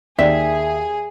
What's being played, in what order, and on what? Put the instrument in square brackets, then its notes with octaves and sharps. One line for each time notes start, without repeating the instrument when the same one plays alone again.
[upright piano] D#2 G5 [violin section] G#4 [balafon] D5 [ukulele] E5